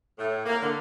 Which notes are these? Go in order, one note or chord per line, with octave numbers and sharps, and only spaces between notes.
A2
A#3
D3